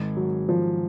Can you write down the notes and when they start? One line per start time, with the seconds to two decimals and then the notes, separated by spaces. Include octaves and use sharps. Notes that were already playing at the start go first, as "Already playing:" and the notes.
Already playing: G#2 D#3 G#3
0.17 F#3
0.49 F3